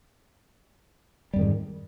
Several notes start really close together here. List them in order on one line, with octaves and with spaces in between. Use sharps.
G3 F2 D#3 G#2